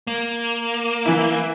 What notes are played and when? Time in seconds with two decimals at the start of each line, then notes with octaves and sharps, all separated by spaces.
0.07 A#3
1.06 E3 E4